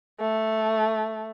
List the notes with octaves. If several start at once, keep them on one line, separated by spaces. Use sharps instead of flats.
A3